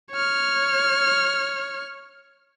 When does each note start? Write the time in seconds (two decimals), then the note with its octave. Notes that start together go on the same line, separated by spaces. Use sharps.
0.12 C#5 F6